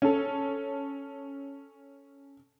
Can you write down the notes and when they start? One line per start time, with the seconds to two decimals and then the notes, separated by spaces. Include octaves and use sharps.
0.02 C#4 A4